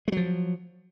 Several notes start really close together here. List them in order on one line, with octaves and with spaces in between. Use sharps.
G#3 F#3 F3